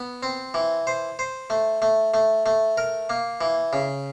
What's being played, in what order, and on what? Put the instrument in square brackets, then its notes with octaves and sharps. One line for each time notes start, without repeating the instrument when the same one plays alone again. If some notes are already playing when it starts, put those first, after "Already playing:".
Already playing: [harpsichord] B3
C4
E3
C5
C5
A3
A3
A3
A3
A#4
A#3
E3
C#3